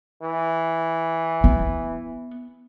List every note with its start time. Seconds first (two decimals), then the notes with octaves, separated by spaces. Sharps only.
0.22 E3
1.44 B3